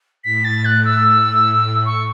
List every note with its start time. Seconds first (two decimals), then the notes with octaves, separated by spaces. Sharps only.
0.24 A2 B6
0.45 A6
0.65 F#6
0.85 E6
1.86 C#6